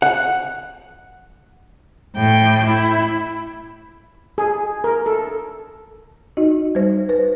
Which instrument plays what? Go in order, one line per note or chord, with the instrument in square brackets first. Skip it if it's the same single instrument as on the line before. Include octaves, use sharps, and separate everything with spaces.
[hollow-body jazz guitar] F#5
[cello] A2 G5
E4
[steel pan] G#4
A#4
A4
[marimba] D#4 F#4 D#5
G3 C5
B4 C5